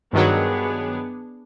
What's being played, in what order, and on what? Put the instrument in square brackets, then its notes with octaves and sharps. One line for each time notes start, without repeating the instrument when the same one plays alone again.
[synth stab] G2 D#3 F#3 [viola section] B3 D4 G#4